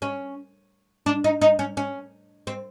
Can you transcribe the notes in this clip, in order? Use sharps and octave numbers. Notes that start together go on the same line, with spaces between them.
C#4
D4
D#4
D#4
C#4
C#4
C4